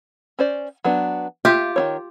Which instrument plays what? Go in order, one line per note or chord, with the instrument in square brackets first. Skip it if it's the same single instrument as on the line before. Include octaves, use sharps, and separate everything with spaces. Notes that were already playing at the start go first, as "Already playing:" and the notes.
[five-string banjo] C#4 C5 D5
F#3 B3 D4
[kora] F4 G4 [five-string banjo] E5
[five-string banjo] D#3 A#3 C#5